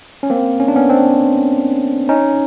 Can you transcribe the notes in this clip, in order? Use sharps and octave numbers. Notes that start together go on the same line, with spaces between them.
C#4
A#3 C4
C#4
D4
B3 C#4
C4 D4
C#4 D#4